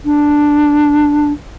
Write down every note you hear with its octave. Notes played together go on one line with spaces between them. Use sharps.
D4